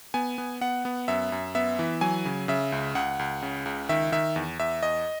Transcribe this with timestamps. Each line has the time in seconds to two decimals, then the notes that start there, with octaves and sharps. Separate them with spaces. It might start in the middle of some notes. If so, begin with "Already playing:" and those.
0.14 B3 G#5
0.38 B3
0.61 B3 F#5
0.85 B3
1.08 F#2 E5
1.32 F#2
1.55 B3 E5
1.79 E3
2.01 F#3 G#5
2.25 C#3
2.48 C#3 E5
2.72 C#2
2.95 C#2 F#5
3.19 C#2
3.42 C#3
3.66 C#2
3.89 D#3 E5
4.12 D#3 E5
4.36 E2
4.59 E2 E5
4.83 E2 D#5